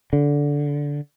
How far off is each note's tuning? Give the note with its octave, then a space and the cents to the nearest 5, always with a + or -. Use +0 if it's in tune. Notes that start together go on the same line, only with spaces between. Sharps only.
D3 -15